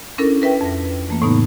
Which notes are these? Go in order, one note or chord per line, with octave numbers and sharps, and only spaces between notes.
C#4 D4 E4 A4 A#4
A#4 B4 E5 G5
F2 A#6
E3 A3 A#3
A2 C#3 B3 D#4